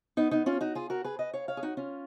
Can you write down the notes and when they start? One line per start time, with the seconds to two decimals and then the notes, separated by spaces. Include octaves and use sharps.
0.17 B3 D#4
0.31 B3 D#4
0.46 C#4 F4
0.61 D#4 F#4
0.75 F4 G#4
0.90 F#4 A#4
1.04 G#4 B4
1.19 B4 D#5
1.34 C#5 F5
1.48 C#5 F5
1.57 G#4
1.63 D#4 F#4
1.77 C#4 F4